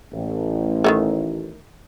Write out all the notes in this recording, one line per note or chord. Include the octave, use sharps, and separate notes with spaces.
A1
D#3 G#3 A3